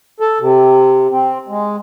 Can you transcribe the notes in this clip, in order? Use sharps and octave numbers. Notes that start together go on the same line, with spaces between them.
A4
C3
C4
G#3